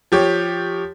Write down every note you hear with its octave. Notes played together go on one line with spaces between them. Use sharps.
F3 G4 C#5